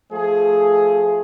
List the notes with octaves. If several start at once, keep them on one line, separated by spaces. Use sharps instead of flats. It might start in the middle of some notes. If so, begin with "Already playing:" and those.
F3 A3 G#4